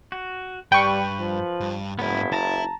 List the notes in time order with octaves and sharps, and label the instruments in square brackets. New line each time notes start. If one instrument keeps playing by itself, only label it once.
[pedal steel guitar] F#4
[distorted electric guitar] G2 [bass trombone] G3 [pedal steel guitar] B4 [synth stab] G5 C#6
[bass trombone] F3
[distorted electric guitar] G2
[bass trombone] F#1 [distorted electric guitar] G#2 C#4 [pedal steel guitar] B3 E4
[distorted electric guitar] E4 [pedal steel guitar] A5 A#5